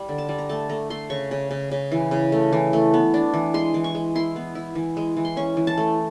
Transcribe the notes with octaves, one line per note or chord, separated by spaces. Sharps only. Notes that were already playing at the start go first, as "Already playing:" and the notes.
Already playing: G3
D3
A5
G3
A#5
A3 A5
A3 A#5
A3 C6
C#3 C#6
C#3
C#3
C#3
E3
C#3
A3
E3
A3
B3
D4
E3
G#3 C6
E3
C#6
G#3
E4 C6
B3
E4
E3
G#3
E3
C6
C#4 C#6
E3
A5
A3